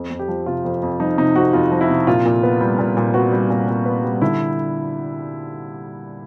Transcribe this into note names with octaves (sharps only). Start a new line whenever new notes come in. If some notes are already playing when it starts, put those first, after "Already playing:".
Already playing: F2
F2
G4
F3
C3 F4
F2
F2
F3 D#4
C3 D#4
F2 F#4
F2 F4
F3
E4
C3
A#2 F4
A#2
B3
G3
A#2
A#2
B3 F#4
G3
A#2
A#2
B3
G3
D3 E4